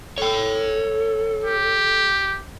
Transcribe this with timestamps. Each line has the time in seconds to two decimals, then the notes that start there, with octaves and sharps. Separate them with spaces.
0.18 A4 C#5 G5
1.44 G4